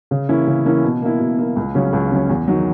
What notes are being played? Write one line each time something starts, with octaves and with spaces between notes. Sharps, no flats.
C#3
E3 A#3 C#4 E4
C#3
E3 A#3 C#4 E4
B2
A#3 E4
B2
A#3 E4
C#2
C#3 F#3 C#4
C#2
C#3 F#3 C#4
E2
D#3 F#3